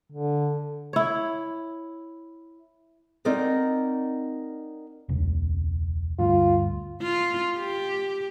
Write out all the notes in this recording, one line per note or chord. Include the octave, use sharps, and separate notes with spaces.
D3
E4 C#5
C4 D#4 A#4 D5 D#5 F#5
E1 C#2
D2 G2 F4
F4
G4